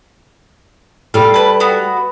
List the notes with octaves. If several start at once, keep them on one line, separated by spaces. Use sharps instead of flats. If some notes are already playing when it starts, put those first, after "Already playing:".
G3 A4 F5
B4 A5
B3 F#4